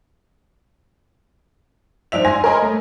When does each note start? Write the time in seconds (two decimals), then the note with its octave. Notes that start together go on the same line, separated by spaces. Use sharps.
2.12 G#2 F3 D4 E5 F7
2.25 G#5 C6 A#6
2.44 A#4 C#5 D#5 G#5 B5 C6
2.62 A3